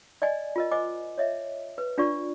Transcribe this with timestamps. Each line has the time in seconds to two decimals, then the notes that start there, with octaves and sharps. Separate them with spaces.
0.22 D5 D#5 G#5
0.56 F4 A#4 D#5
0.72 C5 D#5 G#5 D6
1.18 C#5 D#5 E5
1.78 B4
1.98 D4 F4 D5 C#6